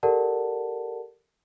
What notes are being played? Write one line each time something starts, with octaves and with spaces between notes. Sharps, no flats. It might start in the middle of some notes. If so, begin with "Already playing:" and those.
G4 A4 A#4 D5 F#5 A5